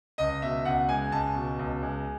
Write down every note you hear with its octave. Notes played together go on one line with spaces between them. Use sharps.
C#2 D#5
B2 E5
C#2 F#5
G#3 G#5
C#2 A5
B2
C#2
G#3